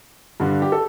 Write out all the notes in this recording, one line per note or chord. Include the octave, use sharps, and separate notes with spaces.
G2 D3
G4
A4